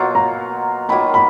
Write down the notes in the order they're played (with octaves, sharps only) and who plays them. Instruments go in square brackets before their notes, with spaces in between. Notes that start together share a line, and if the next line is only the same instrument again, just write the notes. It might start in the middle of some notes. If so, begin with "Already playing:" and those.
Already playing: [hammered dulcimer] B2 F#3 A#3 F4
[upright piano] A#5
[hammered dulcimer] D#3 F#3 A#3 F4 [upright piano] B5
[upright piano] B5